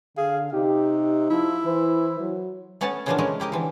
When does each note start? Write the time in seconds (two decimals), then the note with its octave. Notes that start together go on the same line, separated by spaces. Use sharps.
0.17 D3 G#4 F5
0.52 C3 D#4 G4
1.30 F3 E4
1.65 E3 C5
2.20 F#3
2.81 A3 B3 C#4 B4 C#5 A5
3.06 C#3 E3 F3 A#3 B3 D4
3.18 C#3 G#3 A3 C#4 A#4 D#5
3.40 E4 G4 A#4 D#5
3.52 D3 E3 F3